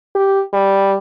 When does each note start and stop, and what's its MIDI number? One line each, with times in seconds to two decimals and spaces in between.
0.15 0.42 67
0.53 0.96 55